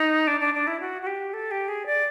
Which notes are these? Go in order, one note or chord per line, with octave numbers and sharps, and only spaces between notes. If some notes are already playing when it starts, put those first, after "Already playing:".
Already playing: D#4
D4
D4
D4
E4
F#4
F#4
G4
A4
G4
G#4
D5